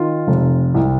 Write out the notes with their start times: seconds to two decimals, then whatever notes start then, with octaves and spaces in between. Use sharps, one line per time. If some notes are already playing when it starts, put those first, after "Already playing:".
Already playing: D#3 F4
0.27 F1
0.74 C2